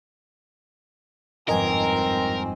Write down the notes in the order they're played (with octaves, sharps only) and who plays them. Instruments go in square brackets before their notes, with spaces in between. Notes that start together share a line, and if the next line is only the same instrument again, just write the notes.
[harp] G1 F2 G#2 [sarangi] C4 [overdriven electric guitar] A#4 [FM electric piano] D#5 G#5